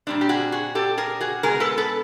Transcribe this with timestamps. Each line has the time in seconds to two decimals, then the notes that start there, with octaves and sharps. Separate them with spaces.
0.07 A#2 G3 C4 D4
0.21 G4
0.29 F#4 G#4
0.52 F#4 G#4
0.75 G4 A4
0.98 G#4 A#4
1.21 F#4 G#4
1.43 B2 G#3 B3 G#4 A#4
1.60 A4 B4
1.78 A4 B4